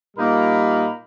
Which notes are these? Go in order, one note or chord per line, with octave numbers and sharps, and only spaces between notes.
A#2 G3 A#3 D#4 A#4 B5